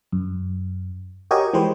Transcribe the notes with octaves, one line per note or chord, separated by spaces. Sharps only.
F#2
F#4 G4 A#4 C#5 D#5 G#5
E3 G#3 G4 B4 C5